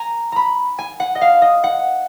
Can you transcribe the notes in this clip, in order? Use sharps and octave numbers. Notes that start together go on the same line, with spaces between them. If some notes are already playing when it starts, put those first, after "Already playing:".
Already playing: G#5 A#5
A#5 B5
G#5
F#5
D#5
F5
D#5
F#5